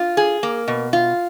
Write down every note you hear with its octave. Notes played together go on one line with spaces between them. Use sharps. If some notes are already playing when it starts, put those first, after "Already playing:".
Already playing: F4
G#4
A#3
B2
F4